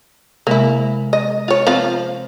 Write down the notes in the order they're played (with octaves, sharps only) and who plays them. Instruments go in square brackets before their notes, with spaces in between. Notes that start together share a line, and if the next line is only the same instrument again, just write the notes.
[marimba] C3 G#3 [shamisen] A#3 E4
[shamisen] D#5
F4 C#5
F3 C4 F5